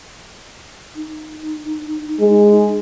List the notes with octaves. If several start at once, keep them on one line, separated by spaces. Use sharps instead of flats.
D#4
G#3